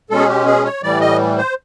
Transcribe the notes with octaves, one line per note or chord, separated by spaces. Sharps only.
B2 G#3 C#4 A4
G#4
G4
G#4
C#5
A2 E3 G3 D5
D#5
C5